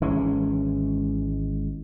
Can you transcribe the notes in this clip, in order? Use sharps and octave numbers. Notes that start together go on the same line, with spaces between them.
G#1 E3 G#3 C#4